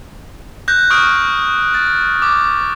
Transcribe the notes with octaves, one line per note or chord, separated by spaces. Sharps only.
F#6 G6 A#6
C#6 D#6 F6 D7
A6
D6